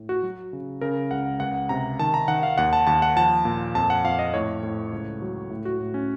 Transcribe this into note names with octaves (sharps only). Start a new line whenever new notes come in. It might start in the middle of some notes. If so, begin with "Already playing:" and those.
Already playing: A2
F#4
F#3
C#3
C#3 A#4
C#2 F#5
C#2 F#5
C3 A#5
D#3 A5
A#5
D#3 F#5
F5
D#2 F#5
A5
D#2 A5
F#5
F3 A5
A#2
F2 A5
F#5
F2 F5
D#5
A2 C#5
A2
C#2
F#3
A2
F#4
A2
C#4